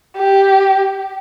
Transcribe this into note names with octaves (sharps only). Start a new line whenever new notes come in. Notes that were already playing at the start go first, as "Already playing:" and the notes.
G4